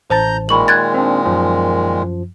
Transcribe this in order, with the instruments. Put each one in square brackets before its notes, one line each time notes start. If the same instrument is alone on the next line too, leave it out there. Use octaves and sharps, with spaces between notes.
[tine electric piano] A1 [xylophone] C5 A5 A6 [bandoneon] A#5 G6
[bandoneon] A#2 D#3 G#3 [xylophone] B5 C#6 F#7
[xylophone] F#6 G#6 A6
[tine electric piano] C4 D4
F#2 F3